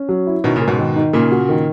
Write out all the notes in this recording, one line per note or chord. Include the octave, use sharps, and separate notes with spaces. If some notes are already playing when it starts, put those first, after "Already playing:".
Already playing: C#4
F#3
E4
B2 D#3 C#4
A#2 C#3
A#4
G#2 B2
D#3
D#4
A#2 C#3 A#3
F#4
D#3